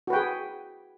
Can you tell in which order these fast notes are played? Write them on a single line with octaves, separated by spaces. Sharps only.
F#4 B4 G5 G#4